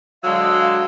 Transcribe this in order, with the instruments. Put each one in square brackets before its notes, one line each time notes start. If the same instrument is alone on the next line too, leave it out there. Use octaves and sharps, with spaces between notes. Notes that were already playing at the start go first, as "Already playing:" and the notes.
[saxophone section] D3 G#3 [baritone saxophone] F#3 [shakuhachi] F5 [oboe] E6